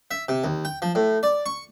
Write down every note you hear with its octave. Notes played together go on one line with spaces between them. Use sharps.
E5
C3
D#2
G5
F3
A2
D5
C#6